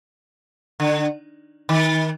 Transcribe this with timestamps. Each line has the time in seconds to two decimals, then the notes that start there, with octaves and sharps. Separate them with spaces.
0.80 D3
1.69 D#3